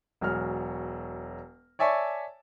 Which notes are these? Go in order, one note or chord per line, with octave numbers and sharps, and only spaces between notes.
E1 F#3 G#4 F6
C#5 D5 E5 G#5 A5 C#6